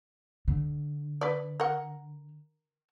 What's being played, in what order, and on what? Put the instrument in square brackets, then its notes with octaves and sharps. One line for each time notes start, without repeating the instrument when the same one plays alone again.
[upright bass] D3
[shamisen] B4 D5
A#4 F#5